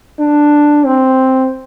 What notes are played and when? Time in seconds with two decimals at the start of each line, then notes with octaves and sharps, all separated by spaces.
0.19 D4
0.86 C4